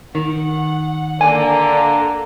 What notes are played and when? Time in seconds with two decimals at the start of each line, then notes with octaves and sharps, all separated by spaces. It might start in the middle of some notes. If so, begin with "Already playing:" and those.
0.15 D#3 F#5
1.21 D3 A#3 D4 A4 G#5